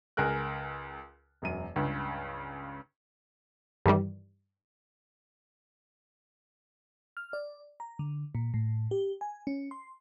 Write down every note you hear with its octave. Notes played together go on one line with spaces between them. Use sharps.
C#2 G#4 A#4 F#6
E1 F#2 D#7
C#2 G2 C#3
G2 D#3 E3 G3
F6
D5
A#5
D3
A#2
A2
G4
G#5
C#4
C6